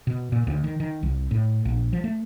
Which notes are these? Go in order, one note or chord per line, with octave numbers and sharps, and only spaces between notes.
B2
A#2
D2
D#3
D#3
C2
A2
A#1
F3
A3